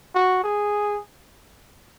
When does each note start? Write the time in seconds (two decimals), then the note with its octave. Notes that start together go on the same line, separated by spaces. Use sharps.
0.15 F#4
0.44 G#4